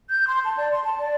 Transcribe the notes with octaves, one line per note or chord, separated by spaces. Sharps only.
G6
C6
A5
D5
C6
A5
D5